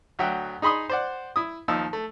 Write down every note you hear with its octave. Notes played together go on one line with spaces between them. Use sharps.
D2 F#3 E5 F#5 G5 E6
D#4 G#4 B5 C6 D#6
C5 D5 F#5
E4 D#6
D#2 F3 D#4 E6
A3